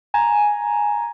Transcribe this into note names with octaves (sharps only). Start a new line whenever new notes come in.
G#5 A#5